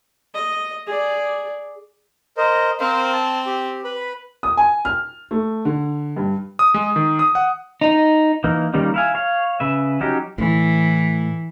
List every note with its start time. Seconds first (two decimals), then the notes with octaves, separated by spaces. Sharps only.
0.35 D#5
0.87 G#4 D5
2.37 A#4 C5 D#5
2.80 C4 A#4 C5 F5
3.13 A5
3.46 G4
3.84 B4 B5
4.43 D#6
4.57 G#5
4.85 F6
5.31 A3
5.65 D3
6.16 G2
6.59 D#6
6.74 G#3
6.96 D#3
7.19 D#6
7.35 F#5
7.81 D#4
8.44 E3 A#3 D#4
8.74 D#3 G3 A#3 C#4 D#4
8.94 E4 F5 G#5
9.15 C#5 F5
9.60 C#3 B4 E5
10.01 F#3 C#4 D#4 G4
10.38 A2 E3